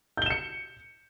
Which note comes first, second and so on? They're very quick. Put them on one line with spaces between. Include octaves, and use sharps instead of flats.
G6 G7 E7 C#7